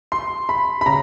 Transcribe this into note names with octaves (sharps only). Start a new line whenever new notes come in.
C6
B5
B5
C#3 A#5